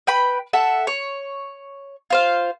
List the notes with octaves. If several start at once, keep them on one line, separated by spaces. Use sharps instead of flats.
B4 G5 B5
A4 E5 F#5
C#5
F4 C5 F5